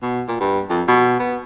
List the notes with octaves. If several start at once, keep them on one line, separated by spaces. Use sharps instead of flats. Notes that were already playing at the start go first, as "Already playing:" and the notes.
B2
A#2
G2
F2
B2
B3